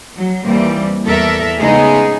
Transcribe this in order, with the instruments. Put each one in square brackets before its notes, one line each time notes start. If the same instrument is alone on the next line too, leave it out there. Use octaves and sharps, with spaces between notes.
[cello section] F#3
D#2 E3 G3 A#3 C4
E2 G3 A4 A#4 E5
C#3 G#3 A3 B3 D#4 G#4